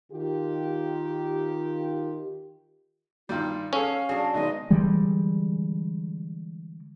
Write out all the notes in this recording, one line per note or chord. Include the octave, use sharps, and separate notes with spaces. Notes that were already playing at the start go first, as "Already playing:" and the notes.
D#3 F4 G4
G2 D#3 G3 F4
C#4 G#4 A4 F5
F#3 D4 G#4
B1 D#3 G#3 D#5
D3 E3 G3 G#3